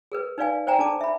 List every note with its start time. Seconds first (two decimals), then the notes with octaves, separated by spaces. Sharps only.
0.12 G#4 A#4 B4
0.38 D#4 B4 D5 F5 G#5
0.67 C5 D5 G5 G#5 A#5
0.79 D4 A4 A5 D6
1.01 E5 B5